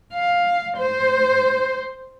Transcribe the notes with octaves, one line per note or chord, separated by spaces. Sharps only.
F5
C5